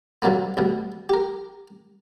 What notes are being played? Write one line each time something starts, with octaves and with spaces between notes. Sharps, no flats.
B2 D3 F#3 G3 A#3 B3
D2 B2 G3
G4 A#4